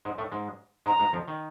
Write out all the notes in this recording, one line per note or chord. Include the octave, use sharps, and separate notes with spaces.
G#2 G#3
A2 A3
G#2 G#3
G#2 G#3 A#5
G#2 G#3
F2 F3
D#3